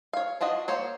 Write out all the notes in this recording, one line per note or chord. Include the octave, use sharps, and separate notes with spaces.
C#5 F5
D4 F4 F#4 D#5
A#3 C5 C#5